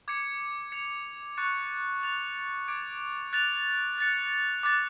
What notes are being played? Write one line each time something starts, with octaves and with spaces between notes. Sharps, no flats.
D6 G#6 C#7
G#6 C#7 F7
C#6 F#6 A6 C#7 F7
F#6 A6 F7
D6 G#6 D7
F#6 A6 F7
F#6 A6 C#7
D6 F#6 A6